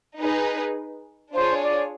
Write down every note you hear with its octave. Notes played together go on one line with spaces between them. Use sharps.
D#4 G#4 B4
D4 F4 G#4 C5 C#5
D5